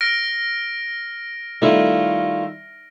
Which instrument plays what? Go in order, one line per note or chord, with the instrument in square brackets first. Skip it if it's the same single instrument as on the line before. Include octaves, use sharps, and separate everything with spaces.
[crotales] F6 A#6 D7
[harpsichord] D#3 G3 E4 [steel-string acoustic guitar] A3 F4